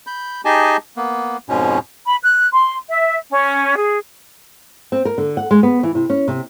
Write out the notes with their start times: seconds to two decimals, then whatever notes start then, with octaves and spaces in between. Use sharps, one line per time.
0.07 B5 G6
0.45 D#4 G4 G#4 D#5 G#5 A5
0.97 A#3 B3
1.49 F2 G#2 B2 C#4
2.06 B5
2.23 F#6
2.53 C6
2.89 E5
3.30 C#4
3.76 G#4
4.92 C4
5.05 A#4
5.18 D3
5.37 F#5
5.51 G#3
5.63 B3
5.83 E3
5.95 C3
6.10 C#4
6.28 C3